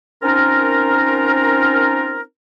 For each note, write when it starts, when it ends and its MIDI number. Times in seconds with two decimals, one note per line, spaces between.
0.22 2.22 60
0.22 2.22 61
0.22 2.22 63
0.22 2.22 65
0.22 2.22 70